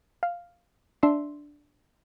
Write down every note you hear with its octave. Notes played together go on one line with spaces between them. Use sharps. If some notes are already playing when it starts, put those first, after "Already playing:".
F5
D4 E5 C6